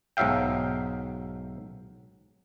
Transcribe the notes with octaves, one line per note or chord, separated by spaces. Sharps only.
B1 G#2 F#3 E5 F5 G5